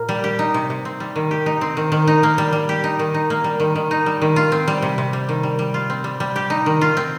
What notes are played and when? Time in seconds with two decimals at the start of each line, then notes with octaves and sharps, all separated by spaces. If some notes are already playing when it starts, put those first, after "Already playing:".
Already playing: A#2 A#3
0.09 G3
0.24 G4
0.39 D#4
0.54 C3
0.70 C3
0.85 C4
1.00 G3
1.16 D#3
1.31 G4
1.46 D#4
1.61 C4
1.77 D#3
1.92 D#3
2.07 D#4
2.23 A#3
2.38 G3
2.53 G3
2.69 G4
2.84 D#4
2.99 D#3
3.14 D#4
3.30 A#3
3.44 G3
3.60 D#3
3.76 D#3
3.91 D#4
4.06 G3
4.22 D#3
4.36 F4
4.52 C4
4.68 G3
4.82 C3
4.98 C3
5.13 G3
5.29 D#3
5.43 G3
5.59 G3
5.74 F4
5.90 C4
6.04 G3
6.20 G3
6.36 G4
6.50 D#4
6.66 D#3
6.81 F4
6.97 C4